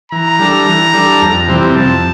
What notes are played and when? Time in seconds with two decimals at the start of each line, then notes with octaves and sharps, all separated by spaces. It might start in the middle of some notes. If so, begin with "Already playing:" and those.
0.12 E3 A#5
0.39 G3 D4 A4
0.66 E3
0.93 G3 D4 A4
1.22 F2
1.48 C3 E3 G3 C4
1.75 F2 A5